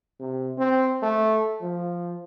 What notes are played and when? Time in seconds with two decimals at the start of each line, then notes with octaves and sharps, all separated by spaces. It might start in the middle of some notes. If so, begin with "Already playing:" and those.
0.20 C3
0.58 C4
1.03 A3
1.61 F3